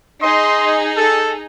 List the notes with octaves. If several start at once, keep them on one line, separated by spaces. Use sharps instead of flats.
D#4 G#4 D#5 C6
A4